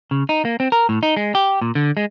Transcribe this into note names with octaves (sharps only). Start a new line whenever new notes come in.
C#3
D#4
A#3
C4
A#4
A2
D#4
G#3
G4
A#2
D3
G#3